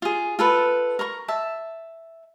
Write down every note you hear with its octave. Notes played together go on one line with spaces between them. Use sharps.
F4 G#4
F4 A4 B4
A#4 A#5 C6 C#6
E5 A5